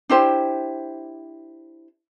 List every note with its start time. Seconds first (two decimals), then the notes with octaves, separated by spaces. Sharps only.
0.09 D4 E4 G4 C5